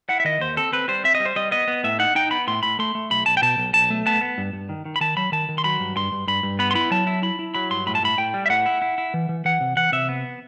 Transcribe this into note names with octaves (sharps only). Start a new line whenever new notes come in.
E4 F#5
E5
D#3 D#5
D#2 C5
C4 A4
C4 B4
G3 C5
C4 E5
D#5
G3
C5
G3 D#5
B3 D#5
B3
A2 E5
D#4 F#5
D#4 G5
B3 B5
A2 C6
A2 B5
A3 C6
A3
B1 B5
B1 A5
G5
B2 A5
B1
B1 A5
A3
B3 A5
B3
G2
G2
D#3
D#3
B5
D#3 A5
F#3 B5
D#3 A5
D#3
C6
F#3 B5
G2
G2 C6
G2
G2 B5
G2
B3 B5
C6
E4 B5
F#3 A5
E4
E4 B5
E4
F#3 B5
G2 C6
A2 B5
A5
A2 B5
A2 G5
G3
E5
A2 F#5
E4
E4
E4
E3
E3
E3 F#5
C3
E3 F#5
C3 E5
B3